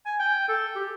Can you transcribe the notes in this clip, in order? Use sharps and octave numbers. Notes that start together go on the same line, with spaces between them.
G#5
G5
A4
G4